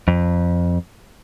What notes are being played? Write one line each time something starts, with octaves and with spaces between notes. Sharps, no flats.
F2